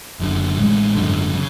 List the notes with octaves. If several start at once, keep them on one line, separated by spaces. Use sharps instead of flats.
F#1 F#2 D3
A1 A2 G#3
G#1 F#2 D3
C#3